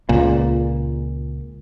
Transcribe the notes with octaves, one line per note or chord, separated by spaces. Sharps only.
C#2 A#2